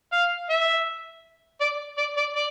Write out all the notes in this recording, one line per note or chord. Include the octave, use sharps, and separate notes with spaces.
F5
E5
D5
D5
D5
D5